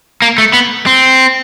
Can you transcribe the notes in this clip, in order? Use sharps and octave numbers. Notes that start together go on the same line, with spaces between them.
A#3
A3
B3
C4